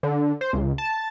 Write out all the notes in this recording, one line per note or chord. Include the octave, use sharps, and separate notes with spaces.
D3
C5
C#2
A5